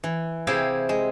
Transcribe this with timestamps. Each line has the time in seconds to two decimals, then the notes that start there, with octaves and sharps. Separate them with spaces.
0.04 E3
0.47 C3 E4 G4 G#4 E5 F5
0.89 G#3